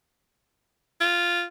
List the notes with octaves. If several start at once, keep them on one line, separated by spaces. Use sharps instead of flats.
F4